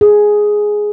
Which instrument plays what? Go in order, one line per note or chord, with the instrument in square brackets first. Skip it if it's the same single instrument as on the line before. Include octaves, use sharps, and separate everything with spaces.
[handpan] G#4